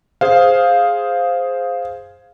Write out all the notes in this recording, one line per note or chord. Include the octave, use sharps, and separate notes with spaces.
G#4 C5 F5